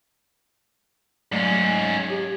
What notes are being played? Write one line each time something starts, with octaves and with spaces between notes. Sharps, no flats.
G#2 F#3 A3 C#4
G4